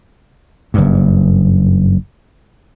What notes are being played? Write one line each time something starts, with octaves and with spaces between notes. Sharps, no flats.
F#1 G2